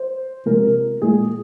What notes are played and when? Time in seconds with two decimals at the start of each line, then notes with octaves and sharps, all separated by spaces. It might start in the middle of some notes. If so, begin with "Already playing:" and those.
Already playing: C5
0.45 C3 F3 G#3 A#4
1.02 A#2 G#3 G#4